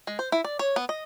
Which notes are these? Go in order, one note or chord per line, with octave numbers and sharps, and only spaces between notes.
G#3
C5
E4
D5
C#5
B3
D#5